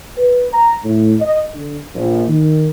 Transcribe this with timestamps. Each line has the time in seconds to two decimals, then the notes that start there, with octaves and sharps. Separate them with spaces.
0.17 B4
0.52 A#5
0.83 A2
1.20 D#5
1.53 D3
1.94 A#1
2.28 D#3